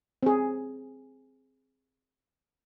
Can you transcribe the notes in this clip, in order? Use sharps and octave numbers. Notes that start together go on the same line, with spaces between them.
C4 G#4